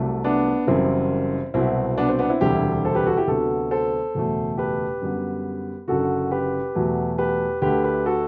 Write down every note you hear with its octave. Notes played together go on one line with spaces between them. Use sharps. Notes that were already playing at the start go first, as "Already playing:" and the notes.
Already playing: C2 C3 F#3 A3
B3 D4
F#1 F#2 E3 G3 C4 E4
C2 B2 F#3 C4 E4
B3 D4
C4
B3 D4
C4 E4
E1 D2 C3 G3 E4 G4
A4 C5
G4 B4
F#4 A4
E4 G4
D2 C3 F#3 B3 F#4 A4
A4 C5
F#1 E2 B2 A3
G4 B4
F#2 D3 G3 B3
F#1 F#2 D3 F#4 A4
G4 B4
E2 B2 F#3 A3
G4 B4
D2 D3 A3 G4 B4
G4 B4
F#4 A4